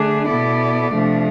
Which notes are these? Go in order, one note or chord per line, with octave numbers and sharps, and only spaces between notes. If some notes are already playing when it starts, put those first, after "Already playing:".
Already playing: D3 A3 D4 G#4
B2 B3 E4 A4 D5
C3 F3 A3 D4